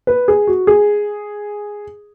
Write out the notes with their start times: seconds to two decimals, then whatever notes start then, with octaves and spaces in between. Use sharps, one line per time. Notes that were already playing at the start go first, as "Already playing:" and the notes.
0.07 B4
0.28 G#4
0.47 F#4
0.67 G#4